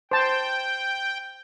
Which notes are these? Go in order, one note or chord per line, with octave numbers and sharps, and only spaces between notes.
C5 G5 A5